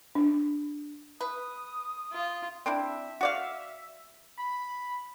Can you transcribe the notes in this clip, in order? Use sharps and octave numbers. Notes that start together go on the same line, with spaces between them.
D4
B4 D#6
F4
C4 D4 E4 E5
F#4 D5 F5
B5